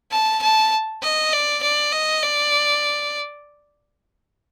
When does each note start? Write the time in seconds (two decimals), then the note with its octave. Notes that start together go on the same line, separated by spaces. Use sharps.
0.12 A5
0.43 A5
1.03 D#5
1.33 D5
1.63 D5
1.92 D#5
2.23 D5